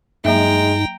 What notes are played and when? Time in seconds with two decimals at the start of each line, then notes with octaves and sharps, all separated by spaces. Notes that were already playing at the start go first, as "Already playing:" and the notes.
0.25 G2 F#3 G#3 A#3 D#4 E5 G5 A#5